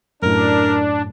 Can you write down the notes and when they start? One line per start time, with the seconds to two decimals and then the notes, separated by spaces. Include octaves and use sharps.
0.22 F#2 A2 D4 A#4